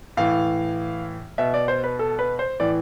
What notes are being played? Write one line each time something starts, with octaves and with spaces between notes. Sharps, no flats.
A2 E3 F5
B2 E5
D5
C5
B4
A4
B4
C5
A2 E3 D5